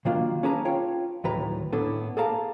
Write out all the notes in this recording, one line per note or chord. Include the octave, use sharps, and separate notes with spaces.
D#3 F#3 A#3 D4 F4
C#4 D4 G#4 B4 A5 A#5
F4 C#5 G5
D2 A2 D#3 F#3 B4 A#5
A2 B3 D4 E4 A4
G#4 A4 D5 F5 A5 A#5